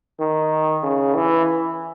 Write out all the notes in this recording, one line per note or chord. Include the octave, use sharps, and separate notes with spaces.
D#3
C#3
E3